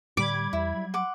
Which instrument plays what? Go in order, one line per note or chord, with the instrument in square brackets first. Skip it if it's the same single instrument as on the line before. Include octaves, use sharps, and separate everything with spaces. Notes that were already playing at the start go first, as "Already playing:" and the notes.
[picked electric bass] A2 D3 [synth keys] G3 B5 G#6 [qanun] D6
[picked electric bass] E2 [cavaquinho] E4
[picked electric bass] F#3
[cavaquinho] F#5 C6 D6